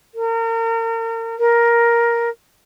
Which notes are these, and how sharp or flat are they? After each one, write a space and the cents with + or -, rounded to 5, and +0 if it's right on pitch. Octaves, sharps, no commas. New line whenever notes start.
A#4 -35
A#4 +10